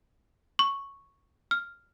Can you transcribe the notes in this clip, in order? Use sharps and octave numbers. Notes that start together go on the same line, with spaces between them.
C#6
F6